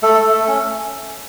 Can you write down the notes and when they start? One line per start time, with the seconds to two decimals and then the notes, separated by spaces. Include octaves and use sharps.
0.02 A3 A4
0.18 A3
0.33 A3
0.47 C#4